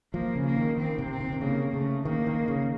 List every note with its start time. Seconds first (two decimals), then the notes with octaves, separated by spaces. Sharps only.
0.13 F3 A#3
0.35 C#3
0.46 A#3
0.57 D#3
0.77 D#3 C4
0.98 C3
1.10 C4
1.21 C3
1.32 D#3
1.41 C#3 A#3
1.73 C#3 A3
2.05 D#3 A#3
2.27 D#3
2.48 C#3